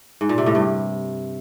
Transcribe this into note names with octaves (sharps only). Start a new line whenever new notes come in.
G#2
A#2
C3
A2
G2